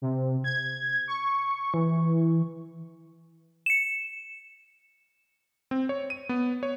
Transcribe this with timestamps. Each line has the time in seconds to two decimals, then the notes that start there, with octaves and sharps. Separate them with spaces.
0.02 C3
0.44 G#6
1.08 C#6
1.74 E3
3.66 C#7 E7
5.71 C4
5.89 C#5
6.10 D#7
6.29 B3
6.63 C#5